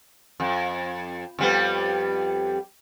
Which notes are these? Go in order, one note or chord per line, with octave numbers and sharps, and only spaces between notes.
F2
F2 G3 B3